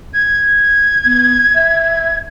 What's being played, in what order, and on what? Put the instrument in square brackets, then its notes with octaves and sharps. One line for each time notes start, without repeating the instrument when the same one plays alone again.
[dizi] G#6
[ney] B3
E5